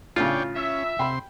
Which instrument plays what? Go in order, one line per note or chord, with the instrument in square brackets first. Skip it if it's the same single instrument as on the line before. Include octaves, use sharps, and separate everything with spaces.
[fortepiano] A2 C#3 [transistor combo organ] D4 C#5 G5 [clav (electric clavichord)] F4
[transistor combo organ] C#4 [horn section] E5
[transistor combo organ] C3 C6 [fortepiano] G5 B5